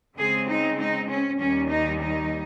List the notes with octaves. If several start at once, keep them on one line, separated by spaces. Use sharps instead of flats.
C#3 G#3 C4 G#4
D#4
D#4
C#4
D#2 D#3 G3 C#4
D#4
D#4